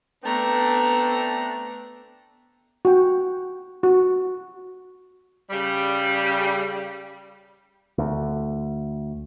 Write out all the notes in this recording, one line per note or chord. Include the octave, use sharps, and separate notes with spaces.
A3 B3 C4 D4 A#5
F#4 G5
F#4
C#3 G3
D2